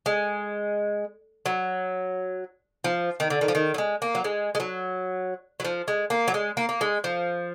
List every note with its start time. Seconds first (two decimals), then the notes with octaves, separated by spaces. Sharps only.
0.06 G#3
1.46 F#3
2.84 F3
3.20 D#3
3.30 D3
3.41 D#3
3.48 F3
3.55 D#3
3.74 F#3
3.78 G#3
4.02 A#3
4.15 F#3
4.24 G#3
4.55 G#3
4.60 F#3
5.60 F#3
5.65 F3
5.88 G#3
6.10 A#3
6.28 F#3
6.34 G#3
6.57 A#3
6.69 A#3
6.81 G#3
7.04 F3